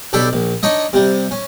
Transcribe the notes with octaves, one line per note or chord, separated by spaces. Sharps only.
B1 D4 G4 A4 B5
A#1
D4 D#4 C#5 D#5
C3 G3
C#4